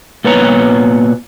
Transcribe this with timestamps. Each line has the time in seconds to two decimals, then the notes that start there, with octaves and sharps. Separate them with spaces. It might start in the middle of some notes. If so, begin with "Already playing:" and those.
0.24 A#2 B3 B4 C#5 A#5